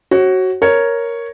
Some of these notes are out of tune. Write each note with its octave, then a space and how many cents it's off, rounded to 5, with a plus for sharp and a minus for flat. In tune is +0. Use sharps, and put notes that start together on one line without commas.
F#4 +15 C#5 -35
A#4 +0 C#5 +0